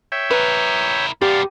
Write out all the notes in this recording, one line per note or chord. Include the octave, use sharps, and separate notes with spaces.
C#5 E5 G5
E4 A#4 B4
F#2 B3 G4 D5 F5